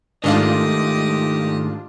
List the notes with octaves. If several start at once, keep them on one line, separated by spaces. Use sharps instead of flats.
G#2 D#3 A3 D4 F4 G4 D#5